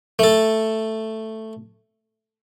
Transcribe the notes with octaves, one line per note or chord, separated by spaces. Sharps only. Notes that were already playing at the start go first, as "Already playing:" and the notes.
A3 A4